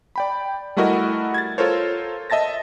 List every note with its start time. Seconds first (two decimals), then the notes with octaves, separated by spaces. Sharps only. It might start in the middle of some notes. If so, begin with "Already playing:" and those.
0.16 D5 G5 B5
0.77 G3 A3 E4 F#4 A#4 D#5
1.34 G#6 A6
1.58 F4 A4 A#4 C5 C#5
2.30 D#5 E5 A5 A6 A#6